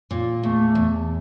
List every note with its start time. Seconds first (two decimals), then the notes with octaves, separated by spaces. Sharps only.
0.11 A#2
0.43 E2 A3
0.75 E2